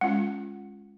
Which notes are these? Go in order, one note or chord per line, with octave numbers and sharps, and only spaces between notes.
G#3 C#4 F4 F#5